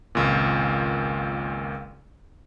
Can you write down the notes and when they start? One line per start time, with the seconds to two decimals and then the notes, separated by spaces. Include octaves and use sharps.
0.15 G#1 C#2 A#2